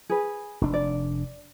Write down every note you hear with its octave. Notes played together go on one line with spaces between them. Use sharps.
G#4 B4
F1 D4
D5